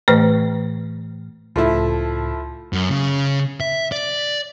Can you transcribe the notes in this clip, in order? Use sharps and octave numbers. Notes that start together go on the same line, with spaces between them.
A2 E3 A3 B4 C5
C#2 A2 F3 A3 E4
F#2
C#3
E5
D5